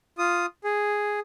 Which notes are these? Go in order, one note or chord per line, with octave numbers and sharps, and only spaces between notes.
F4 D#6
G#4